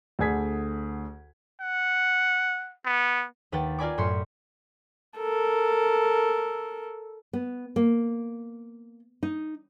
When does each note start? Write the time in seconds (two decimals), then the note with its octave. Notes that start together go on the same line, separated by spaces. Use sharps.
0.19 D2 D3 G#4 G#6 B6
1.61 F#5
2.86 B3
3.52 D#2 B4 F#5 G5 A6
3.79 F4 A#4 D5 G#5 B5 D6
3.98 F#2 A2 B5 C6 G6 C#7
5.19 A4 A#4
7.33 B3
7.76 A#3
9.23 D#4